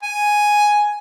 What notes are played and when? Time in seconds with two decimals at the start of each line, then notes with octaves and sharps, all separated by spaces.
0.03 G#5